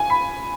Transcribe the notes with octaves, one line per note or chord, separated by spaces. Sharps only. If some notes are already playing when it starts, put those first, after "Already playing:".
Already playing: G#5
B5